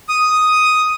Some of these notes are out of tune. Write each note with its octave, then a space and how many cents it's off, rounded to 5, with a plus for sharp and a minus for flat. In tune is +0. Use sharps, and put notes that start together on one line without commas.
D#6 +5